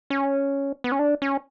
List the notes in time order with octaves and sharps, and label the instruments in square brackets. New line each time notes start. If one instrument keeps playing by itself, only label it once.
[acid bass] C#4
B3
C#4
D4
C#4